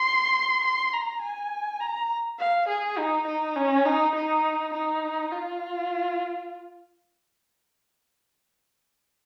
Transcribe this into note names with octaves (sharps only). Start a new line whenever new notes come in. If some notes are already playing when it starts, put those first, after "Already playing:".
Already playing: C6
C6
A#5
G#5
A#5
F5
G#4
D#4
D#4
C#4
D#4
D#4
D#4
F4